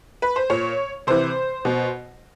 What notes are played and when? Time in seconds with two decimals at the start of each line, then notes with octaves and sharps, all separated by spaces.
0.22 B4
0.36 C5
0.50 A#2 C#5
1.07 C3 E3 C5
1.65 B2